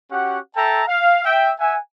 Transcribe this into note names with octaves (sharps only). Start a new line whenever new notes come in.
C#4 F#4 G4 F#5
A4 E5 G5 A5 A#5
F5
E5 G5
E5 F#5 G#5